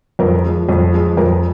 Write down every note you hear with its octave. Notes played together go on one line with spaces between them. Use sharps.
F2 A#4
F3 G#3
F2
F3 G#3
F2 A#4